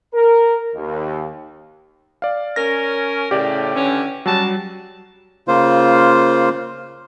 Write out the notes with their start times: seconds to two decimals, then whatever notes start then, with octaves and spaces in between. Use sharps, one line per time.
0.15 A#4
0.75 D#2
2.22 D5 F5
2.56 C#4 A#4 A#6
3.31 A2 C#3 G4 D5
3.75 D3 E3 C#4
4.26 F#3 G3 C#4 F#4 A5
5.48 C#3 A#3 F4 C5